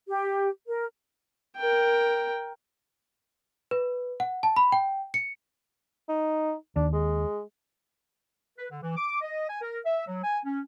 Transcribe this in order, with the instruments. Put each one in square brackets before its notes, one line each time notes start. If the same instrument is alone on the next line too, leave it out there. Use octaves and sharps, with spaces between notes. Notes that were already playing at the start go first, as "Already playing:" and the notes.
[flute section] G4
A#4
[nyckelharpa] A#4 G5
[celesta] B4
F#5
A5
B5
G5
C#7
[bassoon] D#4
[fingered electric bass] D#2 [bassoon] D4
[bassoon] G#3
[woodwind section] B4
D3
E3
D6
D#5
G#5
A#4
E5
F#3
G#5
C#4